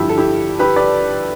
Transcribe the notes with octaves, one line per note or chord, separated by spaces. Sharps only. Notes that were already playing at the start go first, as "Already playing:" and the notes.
Already playing: G2 D3 F3 E4 G4
A4
E4 G4
G4 B4
B4 D5